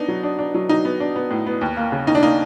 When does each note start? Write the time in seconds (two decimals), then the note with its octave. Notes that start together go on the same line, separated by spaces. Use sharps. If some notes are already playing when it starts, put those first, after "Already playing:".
Already playing: B3 D4 D#4
0.08 F#3
0.23 D4
0.39 D4
0.54 F#3
0.69 F#3 D#4
0.85 B3
1.00 D4
1.16 B3
1.31 A2
1.47 B3
1.61 D#2
1.77 A#3
1.92 C#3
2.07 D#2 D#4
2.15 D4
2.23 A#3 D#4